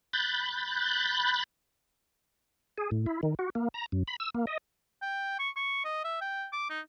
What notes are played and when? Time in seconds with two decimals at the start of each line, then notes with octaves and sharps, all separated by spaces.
0.13 B5 F#6 G6 A6
2.78 G#4
2.91 A2
3.06 E4
3.23 D#3
3.39 F#4
3.55 A#3
3.74 A#5
3.92 F#2
4.08 B5
4.20 E6
4.35 A#3
4.47 D#5
5.02 G5
5.39 C#6
5.56 C#6
5.85 D#5
6.04 E5
6.21 G5
6.53 D6
6.70 D#4